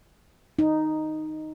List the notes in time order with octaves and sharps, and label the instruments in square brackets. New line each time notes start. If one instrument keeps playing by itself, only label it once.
[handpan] D#4